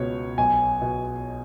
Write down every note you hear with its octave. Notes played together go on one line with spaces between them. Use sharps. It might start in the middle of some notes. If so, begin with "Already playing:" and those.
Already playing: C#2 B2 C#5
B1 G#5
B2